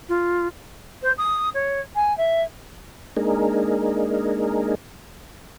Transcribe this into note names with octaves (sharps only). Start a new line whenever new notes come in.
F4
C5
D#6
C#5
G#5
E5
G#3 A#3 D4 D#4 G#4 A#4